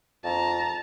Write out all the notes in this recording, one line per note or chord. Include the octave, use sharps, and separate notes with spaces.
F2 A5 A#5